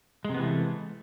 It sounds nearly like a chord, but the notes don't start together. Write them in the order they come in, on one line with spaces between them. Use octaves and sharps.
G#3 C3 B3 E3 A3